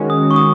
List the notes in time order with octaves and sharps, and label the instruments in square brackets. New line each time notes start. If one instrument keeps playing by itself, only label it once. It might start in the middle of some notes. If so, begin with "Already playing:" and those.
Already playing: [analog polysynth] D#3 G#3 C#4 F#4
[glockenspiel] D#6
C#6
D#6